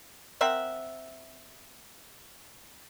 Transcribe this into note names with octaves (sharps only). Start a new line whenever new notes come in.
C4 A#4 E5 F#5